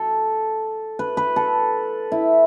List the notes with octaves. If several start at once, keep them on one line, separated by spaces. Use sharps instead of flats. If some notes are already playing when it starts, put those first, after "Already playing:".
Already playing: A4
B4
B4
A4
E4